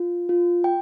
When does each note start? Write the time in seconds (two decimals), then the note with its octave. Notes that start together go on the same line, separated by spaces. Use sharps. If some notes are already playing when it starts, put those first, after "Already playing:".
Already playing: F4
0.29 F4
0.64 G5